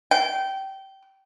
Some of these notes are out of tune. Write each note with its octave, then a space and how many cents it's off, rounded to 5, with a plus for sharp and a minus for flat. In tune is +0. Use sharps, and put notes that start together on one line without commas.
G5 -20